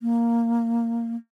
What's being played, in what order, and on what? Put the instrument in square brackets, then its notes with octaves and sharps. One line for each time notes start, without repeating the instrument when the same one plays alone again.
[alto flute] A#3